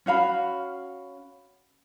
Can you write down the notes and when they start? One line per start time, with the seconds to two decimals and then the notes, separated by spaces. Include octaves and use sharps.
0.06 C#4 F#4 F5 B5